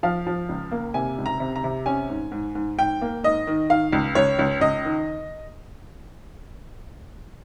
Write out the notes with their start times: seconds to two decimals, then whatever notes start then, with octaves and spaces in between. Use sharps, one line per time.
0.03 F3 F5
0.27 F3
0.49 C#2
0.72 A#3
0.94 C3 G#5
1.18 C#2
1.26 A#5
1.40 C3
1.56 A#5
1.64 C3
1.86 C#4 G#5
2.09 G#2
2.32 G#2
2.55 G#2
2.78 G#2 G5
3.01 A#3
3.24 G#2 D#5
3.47 D#3
3.70 D#3 F5
3.92 C#2
4.15 C#2 C#5
4.39 C#2
4.61 C#2 D#5
4.85 D#3